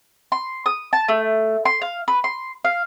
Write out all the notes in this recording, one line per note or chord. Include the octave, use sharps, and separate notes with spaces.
C6
D#6
A5
A3
C6
F5
B4
C6
F5